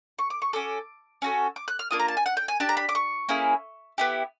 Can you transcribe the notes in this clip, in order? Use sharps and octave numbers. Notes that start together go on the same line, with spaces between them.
C#6
D6
C#6
C#4 F#4 A4 D6
C#4 F#4 A4
D6
F#6
F6
A#3 D4 F4 D#6
A#5
A5
G#5
F#5
G5
G#5
D4 G4 A5
A#5
B5
D6
C#6
A#3 C#4 E4 G#4
B3 E4 G4